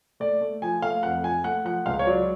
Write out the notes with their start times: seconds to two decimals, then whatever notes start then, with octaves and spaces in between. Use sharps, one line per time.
0.20 A3 D5
0.41 A3
0.62 F3 G#5
0.82 A3 F5
1.03 F2 F#5
1.23 F3 G#5
1.44 A3 F#5
1.65 F3 F#5
1.86 C#2 F5
1.99 C#5
2.07 F#3 D5